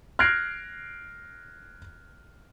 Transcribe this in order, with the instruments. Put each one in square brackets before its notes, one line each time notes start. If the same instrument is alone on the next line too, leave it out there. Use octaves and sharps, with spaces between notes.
[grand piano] F6 F#6 G#6 A#6 C7 D7